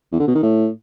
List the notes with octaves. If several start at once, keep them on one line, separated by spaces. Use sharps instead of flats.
E2
D3
B2
D#3
A2